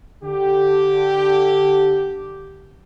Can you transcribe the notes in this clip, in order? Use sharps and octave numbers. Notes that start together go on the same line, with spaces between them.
D3 G4